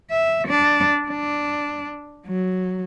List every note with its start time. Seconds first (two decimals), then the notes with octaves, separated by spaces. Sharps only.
0.11 E5
0.48 D4
1.09 D4
2.27 F#3